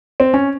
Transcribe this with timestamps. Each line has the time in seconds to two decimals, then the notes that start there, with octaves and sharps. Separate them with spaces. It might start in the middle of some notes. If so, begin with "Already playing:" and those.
0.20 C4
0.34 C#4